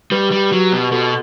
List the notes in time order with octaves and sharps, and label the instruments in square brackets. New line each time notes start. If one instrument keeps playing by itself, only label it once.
[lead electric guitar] G3 [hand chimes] G4 B4
[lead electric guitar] G3
F#3
B2
[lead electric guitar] B2 [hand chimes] F#4 A4